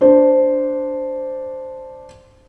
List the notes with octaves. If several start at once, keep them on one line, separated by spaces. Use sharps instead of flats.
D4 C5